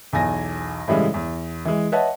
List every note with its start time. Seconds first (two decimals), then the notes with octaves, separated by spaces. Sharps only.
0.13 B1 E2 G#5 A#6
0.88 A2 C#3 E3 G3 G#3
1.14 E2
1.65 E3 G#3
1.92 B4 C#5 D#5 E5 F#5 A5